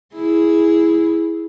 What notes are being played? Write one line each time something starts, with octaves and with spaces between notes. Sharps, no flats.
E4 G#4